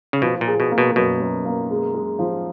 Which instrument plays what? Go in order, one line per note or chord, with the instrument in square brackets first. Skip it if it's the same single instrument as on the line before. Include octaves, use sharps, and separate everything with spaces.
[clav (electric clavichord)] C#3
[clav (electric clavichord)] B2 [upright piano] F3
[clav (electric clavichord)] A#2
[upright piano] G#4
[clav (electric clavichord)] B2
[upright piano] A#3
[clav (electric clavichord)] B2
[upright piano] F#2 [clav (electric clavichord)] B2
[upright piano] F#2
A#3
G#3
G#3
F3